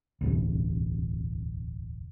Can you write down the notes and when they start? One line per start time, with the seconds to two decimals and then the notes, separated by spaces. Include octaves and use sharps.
0.21 E1 A1 D2